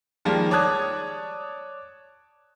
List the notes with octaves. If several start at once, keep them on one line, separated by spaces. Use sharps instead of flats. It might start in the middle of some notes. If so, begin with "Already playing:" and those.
D#3 F3 G3 G#3 A#3
C#5 D5 A5 D#6 F#6 G#6